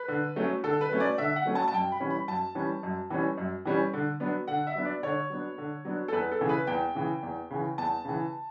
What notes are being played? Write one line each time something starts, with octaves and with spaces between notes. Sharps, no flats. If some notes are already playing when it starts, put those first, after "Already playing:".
Already playing: B4
D3
F#3 A3 C#4
D3 A4
B4
F#3 A3 C#4
D5
D3 E5
F#5
F#3 A3 C#4
A5
A5
F#2 G5
B5
E3 G3 C#4
B5
F#2 A5
E3 G3 C#4
F#2
E3 G3 C#4
F#2
E3 G3 C#4
D3
F#3 B3 D4
D3 F#5
E5
F#3 B3 D4
D5
D3 C#5
F#3 B3 D4
D3
F#3 B3 D4
A4
E2 B4
A4
C#3 E3
B4
E2 G5
C#3 E3
E2
C#3 E3
E2 A5
C#3 E3